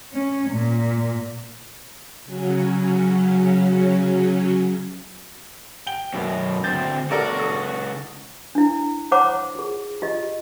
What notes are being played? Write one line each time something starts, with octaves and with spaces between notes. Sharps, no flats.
C#4
A#2
C#3 F#3 C#4
G5 G7
F#2 B2
D2 C4 G6 A6
C#2 F#4 A4 A#4 D5
A4 D#6
D4 E4
C5 C#5 F#5 A#5 B5 D6
F4 G#4
F4 G4 D#5